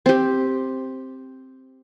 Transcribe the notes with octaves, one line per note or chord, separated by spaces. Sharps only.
C4 G4